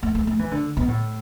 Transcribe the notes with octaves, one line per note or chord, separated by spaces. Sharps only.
A3
A3
A3
E3
D3
B2
A2